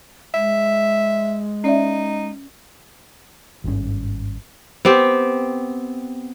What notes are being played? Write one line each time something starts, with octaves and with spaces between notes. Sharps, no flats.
G#3 E5
C#4 D#4 D5 E5
G#1 G2 D3 C#4
B3 C4 G4